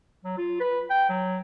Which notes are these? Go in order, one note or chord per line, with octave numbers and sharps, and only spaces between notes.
F#3
F4
B4
G5
F#3